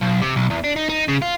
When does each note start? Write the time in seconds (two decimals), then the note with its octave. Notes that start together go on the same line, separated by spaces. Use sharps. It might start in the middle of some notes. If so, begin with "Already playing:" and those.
0.02 B1
0.22 C3
0.36 B1
0.50 E2
0.64 D4
0.76 D#4
0.89 D#4
1.08 C#3
1.22 F4